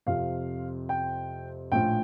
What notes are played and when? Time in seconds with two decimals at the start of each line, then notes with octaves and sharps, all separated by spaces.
0.06 F2 C3 F3 F5
0.89 G5
1.71 A#1 A2 F3 G5